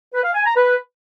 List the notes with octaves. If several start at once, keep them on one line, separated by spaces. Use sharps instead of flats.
B4
F5
G#5
A#5
B4